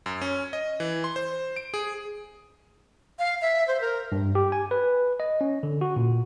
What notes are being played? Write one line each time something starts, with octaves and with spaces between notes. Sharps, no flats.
F#2
C#4
D#5
E3
C6
C5
D7
G#4
F5
E5
C5
A#4
G2
G4
G#5
B4
D#5
C#4
D3
F#4
A#2